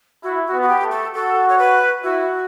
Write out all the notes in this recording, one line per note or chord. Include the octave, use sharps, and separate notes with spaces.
E4 F#4
F#4
B3
F#4
G4
A3
A4
F#4 A4
C#5
B4
E4 F#4